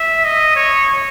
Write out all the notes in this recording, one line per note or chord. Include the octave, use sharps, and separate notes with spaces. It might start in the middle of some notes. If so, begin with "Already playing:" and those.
Already playing: E5
D#5
C#5